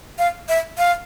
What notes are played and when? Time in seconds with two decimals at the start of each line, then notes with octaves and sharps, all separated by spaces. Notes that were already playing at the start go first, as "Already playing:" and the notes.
0.19 F5
0.49 E5
0.78 F5